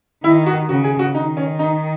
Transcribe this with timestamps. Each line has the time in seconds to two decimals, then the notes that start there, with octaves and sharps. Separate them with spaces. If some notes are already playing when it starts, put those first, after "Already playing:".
0.24 D#3 E4
0.46 F#4
0.69 C#3 F#4
0.84 G#4
0.99 F#4
1.14 D#3 D#4
1.37 C#4
1.59 D#4